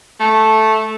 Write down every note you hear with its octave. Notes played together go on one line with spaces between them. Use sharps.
A3